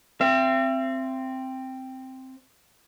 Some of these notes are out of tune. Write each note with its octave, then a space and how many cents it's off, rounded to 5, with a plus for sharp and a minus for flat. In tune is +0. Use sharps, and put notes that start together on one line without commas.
C4 +0 E5 +40